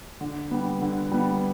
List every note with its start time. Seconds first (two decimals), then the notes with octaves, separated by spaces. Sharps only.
0.21 D3
0.51 G3 B3
0.82 D3
1.12 G3 B3